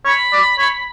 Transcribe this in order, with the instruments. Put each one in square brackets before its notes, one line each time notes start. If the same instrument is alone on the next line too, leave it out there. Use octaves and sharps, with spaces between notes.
[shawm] C#5 [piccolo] B5
[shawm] D5
C#5